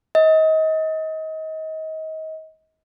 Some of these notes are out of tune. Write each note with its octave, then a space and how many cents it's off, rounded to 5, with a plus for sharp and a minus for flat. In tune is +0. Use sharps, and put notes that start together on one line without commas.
D#5 +30